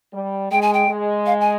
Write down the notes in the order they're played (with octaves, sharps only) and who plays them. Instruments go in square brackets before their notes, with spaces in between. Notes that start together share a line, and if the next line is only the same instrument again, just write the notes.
[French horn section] G3
[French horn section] G#3 [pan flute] G5
[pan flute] G#5
G5
[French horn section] G#3
[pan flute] F5
G#5